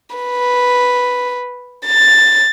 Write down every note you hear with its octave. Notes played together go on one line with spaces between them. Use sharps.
B4
A6